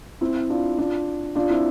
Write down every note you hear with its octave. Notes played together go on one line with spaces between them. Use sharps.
C4 E4
D4 F4
D4 F4
D4 F4
C4 E4